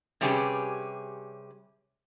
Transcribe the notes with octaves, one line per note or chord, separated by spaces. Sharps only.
C3 G3 C#4 G4 G#4 B4